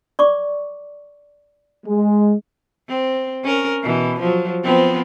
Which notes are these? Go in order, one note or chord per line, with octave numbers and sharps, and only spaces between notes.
D5 C#6 D6
G#3
C4
C#4 A#4
B2 E3
F3 F#3
F3 B3 C4